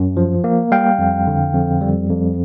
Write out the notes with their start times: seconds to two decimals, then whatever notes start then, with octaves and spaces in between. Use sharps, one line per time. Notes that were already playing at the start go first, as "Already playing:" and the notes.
Already playing: F#2
0.17 F3
0.44 A#3
0.72 G3 F5 G5
0.99 F2
1.27 D3
1.53 F2
1.81 G3
2.10 F2